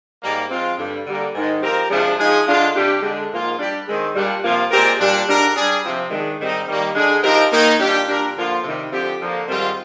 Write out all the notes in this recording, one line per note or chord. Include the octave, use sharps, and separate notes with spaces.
G#2 G3 A#3
F3 G#3 C4 F4
G2 D3 G3
D3 G3 A#3
G#2 D#3 G#3
F3 C4 G4 A#4
C3 F3 G#3 D4
F3 G#3 D#4 G#4
D3 G#3 D4 F4
C3 G3 D4 G4
D3 G#3 D4
G#2 F3 A#3 F4 A#4
G3 D4 G4
D#3 G#3 C4
A#2 G3 D4
C3 F3 A#3 F4
A#2 G#3 C4 G4 A#4
A#2 G3 D4
G#2 G3 D4 G4 A#4
G3 D4 G#4
C3 F3 C4
D#3 G#3 D4
G#2 D#3 G3 C4 D#4
D#3 G3 A#3
D3 G#3 D4 G#4
F3 C4 D#4 G4 A#4
D#3 A#3 D#4
A#2 G3 D4 G4
A#2 G3 D4 G4 A#4
D3 F3 A#3 F4
C3 D#3 G3
D3 F3 C4 G4
D3 F3 A#3
G#2 D#3 G3 C4 F4